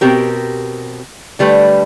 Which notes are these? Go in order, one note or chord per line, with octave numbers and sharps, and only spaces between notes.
B2 C4 G4 A#4
D3 G3 A3 B4